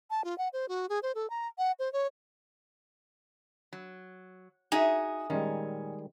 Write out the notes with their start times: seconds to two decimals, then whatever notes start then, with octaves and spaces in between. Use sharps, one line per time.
0.10 A5
0.24 F4
0.38 F#5
0.53 C5
0.69 F#4
0.89 G#4
1.03 C5
1.15 A4
1.30 A#5
1.58 F#5
1.79 C5
1.93 C#5
3.73 F#3
4.72 D#4 F#4 G#4 E5
5.30 A#2 D#3 G3 G#3 C#4